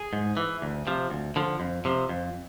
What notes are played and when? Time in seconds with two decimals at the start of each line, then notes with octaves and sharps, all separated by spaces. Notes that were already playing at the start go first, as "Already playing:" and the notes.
Already playing: G#4
0.13 G#2
0.37 E3
0.62 D2
0.87 C3 F3
1.10 D2
1.36 D3 F3
1.60 F2
1.85 C3 F3
2.09 F2